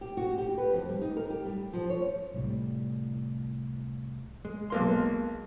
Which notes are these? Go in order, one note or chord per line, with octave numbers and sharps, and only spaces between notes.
G4
F#4
G4
B4
F2
G3
D#4
A#4
G4
G3
F3
C#5
C2 A2 G3
G#3
B1 A#3 C6